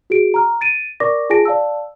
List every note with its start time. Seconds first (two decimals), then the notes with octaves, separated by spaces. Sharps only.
0.10 F#4 G#4 D7
0.34 A#5 F6
0.61 A6 D7 D#7
1.00 A#4 D5 C#6 D6 A#6
1.30 F4 G#4 G#5 A5 A#6 D7
1.45 D5 F5 A5 E6